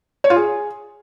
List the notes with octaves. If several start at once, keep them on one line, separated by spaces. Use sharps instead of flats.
C#5
F4
G#4